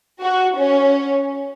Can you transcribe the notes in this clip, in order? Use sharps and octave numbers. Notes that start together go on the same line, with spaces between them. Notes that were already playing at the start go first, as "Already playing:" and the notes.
F#4
C#4